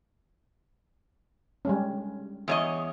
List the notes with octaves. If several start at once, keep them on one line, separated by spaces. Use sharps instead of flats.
G3 G#3 C#4
E2 C#5 D#5